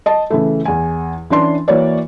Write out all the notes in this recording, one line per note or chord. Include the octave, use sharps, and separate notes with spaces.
D#5 A5
C#3 E3 A3
E2 G#5
E3 C#4 D4 C6
E3 A#3 F#4 C#5 D5